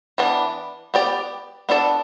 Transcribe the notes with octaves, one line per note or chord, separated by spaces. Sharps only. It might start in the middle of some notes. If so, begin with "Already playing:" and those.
E3 B3 D4
B3 G4 D5
B3 D4 A4 D5